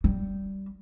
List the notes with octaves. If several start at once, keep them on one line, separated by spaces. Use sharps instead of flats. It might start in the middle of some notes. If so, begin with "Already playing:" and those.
G3